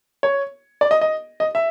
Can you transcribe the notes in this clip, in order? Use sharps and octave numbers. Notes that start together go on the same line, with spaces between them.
C#5
D5
D#5
D#5
D#5
E5